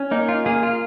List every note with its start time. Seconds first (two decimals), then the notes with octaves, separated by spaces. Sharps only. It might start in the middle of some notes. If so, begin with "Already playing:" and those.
Already playing: C#4
0.11 A#3 D#4
0.29 F4
0.46 A#3 G#4
0.63 F4